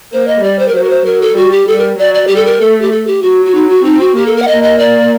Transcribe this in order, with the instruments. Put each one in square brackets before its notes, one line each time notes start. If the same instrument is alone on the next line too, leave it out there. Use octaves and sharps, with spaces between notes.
[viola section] A#3 [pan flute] C5
[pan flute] D#5
[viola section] G3 [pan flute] D5
[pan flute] C5
A#4
[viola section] F#3 [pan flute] C5
[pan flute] A#4
C5
[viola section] F#3 [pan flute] A#4
[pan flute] A4
[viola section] G3 [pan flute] F#4
[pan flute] G4
[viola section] G3 [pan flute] A4
[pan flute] A#4
[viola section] F#3 [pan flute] D5
[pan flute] D5
[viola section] G3 [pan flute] G4
[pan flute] A4
A#4
[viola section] A3 [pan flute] A4
[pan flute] G4
A4
G4
[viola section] F#3 [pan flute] F#4
[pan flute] F#4
D#4
F#4
[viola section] C4 [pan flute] D#4
[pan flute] F#4
[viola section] A#3 [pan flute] G4
[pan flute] A4
A#4
F#5
[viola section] A#3 [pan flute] D#5
[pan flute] D#5
D5